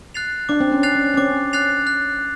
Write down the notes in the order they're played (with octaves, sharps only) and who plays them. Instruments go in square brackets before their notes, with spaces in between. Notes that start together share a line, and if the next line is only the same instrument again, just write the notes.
[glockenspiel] F#6 A6 C7 F7
[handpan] D4 [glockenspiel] D6
[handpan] C4
C#4
[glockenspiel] F#6 A6 C7 F7
[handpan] C#4
C#4
[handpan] C4 [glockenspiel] D6
[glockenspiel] F#6 A6 C7 F7
F#6